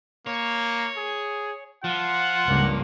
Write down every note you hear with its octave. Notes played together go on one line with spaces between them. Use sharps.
A#3 C#5
G#4
F3 F4 F#5
C#2 G2 A#3